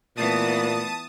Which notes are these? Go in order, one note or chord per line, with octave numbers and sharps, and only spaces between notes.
A#2 E3 A3 B3 A5 D#6